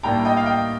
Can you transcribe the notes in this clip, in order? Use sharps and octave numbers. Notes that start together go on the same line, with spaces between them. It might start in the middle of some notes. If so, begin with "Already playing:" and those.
A2 G3 A#3 D4 G5 A#5
D#5 G5
F5
D#5 G5